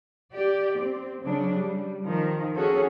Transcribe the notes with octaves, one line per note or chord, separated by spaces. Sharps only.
G4 D5
C4
C#3 F#3 D4
G3
D#3 F3
C#4 F#4 G#4 A4 C#5